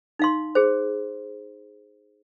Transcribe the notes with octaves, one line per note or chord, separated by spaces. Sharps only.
D#4 F5 C6
G#4 C5